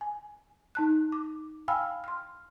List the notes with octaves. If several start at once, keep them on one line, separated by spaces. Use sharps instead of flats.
G#5
D#4 A5 F#6
D6
F5 G5 G#5 B5 E6 F6
C6 F6